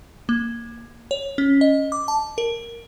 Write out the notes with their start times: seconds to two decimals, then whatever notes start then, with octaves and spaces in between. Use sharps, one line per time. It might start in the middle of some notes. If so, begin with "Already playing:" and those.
0.29 A#3
1.11 C#5
1.38 C#4
1.61 D#5
1.92 D6
2.08 A5
2.38 A#4